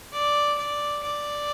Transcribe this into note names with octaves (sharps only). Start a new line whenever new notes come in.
D5
D5
D5